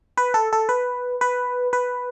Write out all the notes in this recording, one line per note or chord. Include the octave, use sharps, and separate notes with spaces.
B4
A4
A4
B4
B4
B4